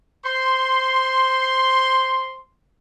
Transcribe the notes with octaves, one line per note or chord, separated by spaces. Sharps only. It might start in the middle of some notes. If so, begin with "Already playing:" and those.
C5 C6